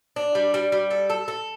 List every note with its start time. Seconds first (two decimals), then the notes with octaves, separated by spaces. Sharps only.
0.16 D4
0.35 G3
0.54 G3
0.72 G3
0.91 A4
1.10 A4
1.28 A4